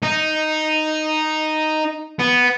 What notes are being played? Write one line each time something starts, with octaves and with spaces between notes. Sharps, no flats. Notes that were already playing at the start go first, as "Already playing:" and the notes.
D#4
B3